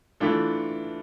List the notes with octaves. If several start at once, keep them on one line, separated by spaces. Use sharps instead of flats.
E3 A3 D4 F4 A4